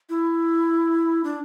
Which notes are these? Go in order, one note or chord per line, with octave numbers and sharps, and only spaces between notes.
E4
D4